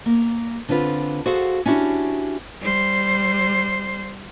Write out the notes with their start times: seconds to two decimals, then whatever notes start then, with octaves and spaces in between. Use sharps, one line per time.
0.06 A#3
0.69 D3 C4 F4 B4
1.26 F#4 G#4 A4 C5 F5 F#5
1.66 C#4 D4 E4 F#4 G4
2.61 G3 C5